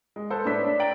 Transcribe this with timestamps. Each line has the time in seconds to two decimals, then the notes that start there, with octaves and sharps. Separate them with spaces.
0.16 G#3
0.30 A4 B4 C5
0.45 A2 D4 B4 C#5 E6 B6
0.64 D4
0.79 G5 A#5 A6 D7 F#7